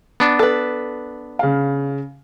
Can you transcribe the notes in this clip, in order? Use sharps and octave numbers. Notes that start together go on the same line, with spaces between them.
B3 D4
A4 B4
C#3 F5